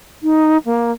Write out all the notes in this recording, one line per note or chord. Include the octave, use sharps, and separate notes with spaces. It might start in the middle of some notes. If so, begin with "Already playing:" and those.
D#4
A#3